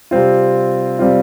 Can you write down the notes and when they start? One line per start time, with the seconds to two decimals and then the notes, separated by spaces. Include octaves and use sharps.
0.11 C3 G3 C4 F4
0.99 C3 G3 C4 F4